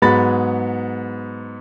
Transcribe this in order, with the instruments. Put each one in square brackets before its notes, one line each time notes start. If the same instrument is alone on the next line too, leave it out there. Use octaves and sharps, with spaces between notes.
[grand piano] G#2 F#3 B3 G#4 B5 A6